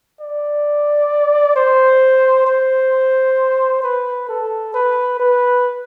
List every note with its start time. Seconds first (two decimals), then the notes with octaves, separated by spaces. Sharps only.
0.20 D5
1.56 C5
2.47 C5
3.83 B4
4.29 A4
4.74 B4
5.19 B4